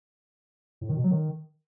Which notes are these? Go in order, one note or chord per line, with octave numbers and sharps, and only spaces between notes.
A2
D#3
B2
F#3
D#3